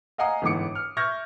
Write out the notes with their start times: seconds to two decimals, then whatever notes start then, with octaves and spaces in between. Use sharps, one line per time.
0.18 D#5 F5 F#5 G#5 A#5 D#6
0.42 G1 G#2 E3 D6 C#7
0.75 F6
0.97 E5 C#6 F6 G6 G#6 A#6